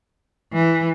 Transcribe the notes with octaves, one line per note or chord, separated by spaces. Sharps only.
E3